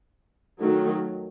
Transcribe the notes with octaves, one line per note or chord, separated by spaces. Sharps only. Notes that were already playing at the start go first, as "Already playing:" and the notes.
D#3 F#3 A3